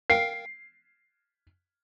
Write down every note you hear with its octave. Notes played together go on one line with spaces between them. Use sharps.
A#4 F5 G5 C7